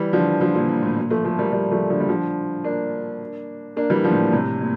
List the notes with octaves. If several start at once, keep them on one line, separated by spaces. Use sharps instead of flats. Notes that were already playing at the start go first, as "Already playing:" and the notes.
Already playing: E3 G3
D3 F3
D3 F3
A#2 D3
A#2
A2
A#2
F3 A3
F3 A3
G3 A#3
G3 A#3
F3 A3
D3 F3
G3
D3 F3
A#3 D4
A#3 D4
E3 G3
D3 F3
A2
A#2
A2 C3
A#2